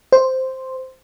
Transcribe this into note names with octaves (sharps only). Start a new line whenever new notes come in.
C5